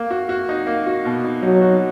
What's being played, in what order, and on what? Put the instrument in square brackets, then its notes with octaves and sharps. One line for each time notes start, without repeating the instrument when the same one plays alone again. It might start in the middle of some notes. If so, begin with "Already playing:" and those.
Already playing: [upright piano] A#3
F#4
F#4
D#4
A#3
F#4
B2
D#4
[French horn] F#3 [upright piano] D#4
[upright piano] F#4